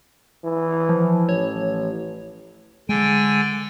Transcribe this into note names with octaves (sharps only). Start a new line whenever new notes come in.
E3
F3
A1 C#5
D3 G#3 G5 G#5